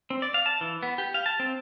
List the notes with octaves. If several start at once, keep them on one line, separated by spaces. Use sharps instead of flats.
C4
D5
F5
A5
E3
B3
G4
F5
A5
C4